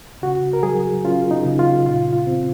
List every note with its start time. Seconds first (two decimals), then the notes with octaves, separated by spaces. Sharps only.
0.22 C#3 F#4
0.53 A#4
0.63 F#3 G#4
1.04 C#4 F4
1.31 D#4
1.45 C#3
1.59 F4
1.86 A#2 F4
2.12 F4
2.27 C4